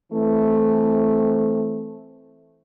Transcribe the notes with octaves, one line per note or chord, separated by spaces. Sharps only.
E3 A3 C4